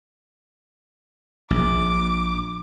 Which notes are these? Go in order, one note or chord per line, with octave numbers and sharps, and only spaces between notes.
A#1 D6